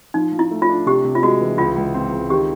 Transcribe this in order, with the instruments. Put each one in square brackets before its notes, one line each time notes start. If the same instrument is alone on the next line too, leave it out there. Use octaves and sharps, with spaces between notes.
[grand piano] F3 [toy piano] D#4
[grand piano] F3
[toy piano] E4
[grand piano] A3
[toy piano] F4
[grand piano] D4
[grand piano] C3 [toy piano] G4
[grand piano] C3
[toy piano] F4
[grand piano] G#3 [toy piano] F#4
[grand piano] E3
[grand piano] C#2 [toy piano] F4
[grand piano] C#2
C4
C#2
[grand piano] D#3 [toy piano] G4